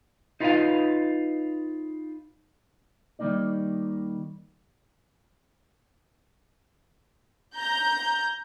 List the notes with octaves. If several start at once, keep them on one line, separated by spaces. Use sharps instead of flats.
D#4 F4 B4 D5 D#5 F5
D#3 G3 A3 A#3 D#4 D5
A#5 G6